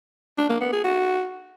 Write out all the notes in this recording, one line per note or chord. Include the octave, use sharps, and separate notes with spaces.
D4
A#3
B3
G#4
F#4